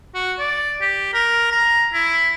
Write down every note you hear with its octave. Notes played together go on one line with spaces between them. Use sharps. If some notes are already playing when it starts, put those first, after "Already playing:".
F#4
D5
G4
A#4
A#5
E4